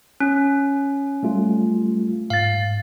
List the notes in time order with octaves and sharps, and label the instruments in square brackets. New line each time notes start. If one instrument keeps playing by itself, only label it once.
[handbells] C#4
[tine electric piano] G3 A3 F4
[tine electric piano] G#2 A6 [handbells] F5